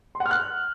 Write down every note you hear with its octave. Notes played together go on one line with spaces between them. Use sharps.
C6
F#5
F6
F#6